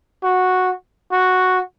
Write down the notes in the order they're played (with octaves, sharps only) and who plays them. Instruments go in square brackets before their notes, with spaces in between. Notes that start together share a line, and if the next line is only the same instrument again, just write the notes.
[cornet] F#4
F#4